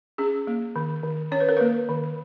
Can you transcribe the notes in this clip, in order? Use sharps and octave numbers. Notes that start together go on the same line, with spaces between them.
C#4 G#4
A#3
D#3
D#3
C#4 C#5
B4
A#4
A#3 B4
D#3